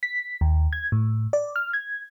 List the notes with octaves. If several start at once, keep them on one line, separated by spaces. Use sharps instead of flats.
B6
D#2
G#6
A2
D5
F6
G#6